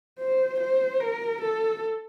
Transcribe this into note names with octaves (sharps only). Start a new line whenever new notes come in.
C5
C5
A#4
A4